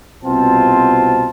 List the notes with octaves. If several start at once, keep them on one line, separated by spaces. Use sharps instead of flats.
C2 B2 C4 F4 A5